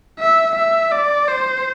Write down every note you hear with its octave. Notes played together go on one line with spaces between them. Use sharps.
E5
E5
D5
C5